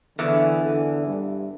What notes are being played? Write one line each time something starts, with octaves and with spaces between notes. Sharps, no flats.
E2 D3 E3
D3
G2